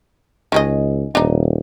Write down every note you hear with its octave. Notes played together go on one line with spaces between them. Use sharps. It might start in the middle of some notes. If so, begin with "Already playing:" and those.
C#2 D#3 G#3 D#5
D#1 D4 D#4